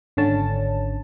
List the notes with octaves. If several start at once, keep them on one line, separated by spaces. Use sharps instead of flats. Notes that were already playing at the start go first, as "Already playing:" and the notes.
G#1 D3 C#4 A5